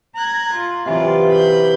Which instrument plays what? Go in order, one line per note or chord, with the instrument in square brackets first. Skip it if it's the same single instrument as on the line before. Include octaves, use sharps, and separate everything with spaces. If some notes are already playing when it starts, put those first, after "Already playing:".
[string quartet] A#5 F#6 G#6
F4
[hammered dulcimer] C3 E3 F#3 [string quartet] F4 D5
[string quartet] B5 G6